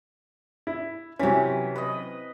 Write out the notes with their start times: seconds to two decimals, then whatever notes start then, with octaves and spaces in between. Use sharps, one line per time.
0.67 E4
1.19 C3 E3 F#3 C#4
1.76 B4 D#5